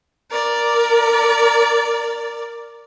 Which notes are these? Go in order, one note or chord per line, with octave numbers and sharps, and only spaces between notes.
A#4 D5